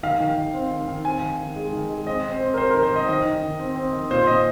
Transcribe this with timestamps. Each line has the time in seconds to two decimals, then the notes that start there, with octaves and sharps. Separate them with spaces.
0.03 D#3 F5
0.20 D#3
0.37 D#3
0.54 C4
0.71 D#3
0.88 D#3
1.05 C4 G#5
1.22 D#3
1.39 D#3
1.56 G#3
1.73 D#3
1.90 G#3
2.07 C4 D#5
2.24 C4
2.33 C5
2.41 C4
2.54 A#4
2.58 C4 C5
2.70 D#3 A#4
2.83 C5
2.92 D#3 D#5
3.08 D#3 D#5
3.25 D#3
3.43 D#3
3.60 C4
3.76 C4
3.93 D#3
4.10 A#2 C5
4.27 A#2 D#5